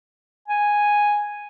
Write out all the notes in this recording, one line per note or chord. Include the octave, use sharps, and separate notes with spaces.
G#5